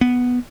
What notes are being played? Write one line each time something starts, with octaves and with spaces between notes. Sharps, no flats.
B3